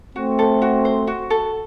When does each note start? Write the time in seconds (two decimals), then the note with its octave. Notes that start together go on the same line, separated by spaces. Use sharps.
0.16 A3 C4 F#4
0.39 A4
0.62 F#4
0.85 C5
1.07 F#4
1.30 A4